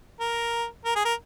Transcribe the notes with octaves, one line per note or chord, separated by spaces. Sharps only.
A#4
A#4
G#4
A#4